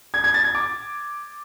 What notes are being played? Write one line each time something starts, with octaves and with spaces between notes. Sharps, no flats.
G#6
G#6
A6
G#6
D6